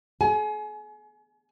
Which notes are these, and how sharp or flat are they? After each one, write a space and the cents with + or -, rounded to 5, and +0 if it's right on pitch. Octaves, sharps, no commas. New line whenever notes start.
G#4 +45 G#5 +30